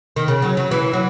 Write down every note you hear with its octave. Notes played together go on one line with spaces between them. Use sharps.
D#3
C#3
F#3
F#3
E3
F#3